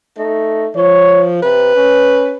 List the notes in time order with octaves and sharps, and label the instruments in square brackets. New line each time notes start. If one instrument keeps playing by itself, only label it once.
[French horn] A3 [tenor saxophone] D#4
[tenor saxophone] F3 [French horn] C#5
[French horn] C3 [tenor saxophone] B4
[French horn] C#4